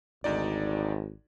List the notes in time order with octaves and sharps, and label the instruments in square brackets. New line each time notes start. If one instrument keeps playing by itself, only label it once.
[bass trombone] G#1 [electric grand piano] D2 D#4 D5